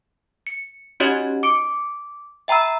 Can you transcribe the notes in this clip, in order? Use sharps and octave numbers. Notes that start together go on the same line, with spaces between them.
C#7
C#4 D#4 F#4 G4 C#5 D#5
D6 C#7 D7
E5 G5 A#5 B5 E6